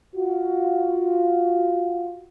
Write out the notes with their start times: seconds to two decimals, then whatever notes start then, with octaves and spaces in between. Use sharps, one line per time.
0.16 F4 F#4